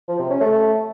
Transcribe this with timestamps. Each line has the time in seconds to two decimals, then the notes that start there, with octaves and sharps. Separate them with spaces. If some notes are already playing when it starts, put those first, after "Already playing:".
0.08 F3
0.19 C3
0.30 C#4
0.41 A3